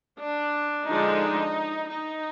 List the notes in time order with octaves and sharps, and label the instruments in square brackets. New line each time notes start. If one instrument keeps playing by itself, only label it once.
[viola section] D4
D3 F3 G#3 D4 D#4
D#4